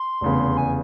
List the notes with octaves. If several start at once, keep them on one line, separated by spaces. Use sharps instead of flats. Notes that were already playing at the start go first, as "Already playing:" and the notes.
Already playing: C6
F1 E2 C#3
G#5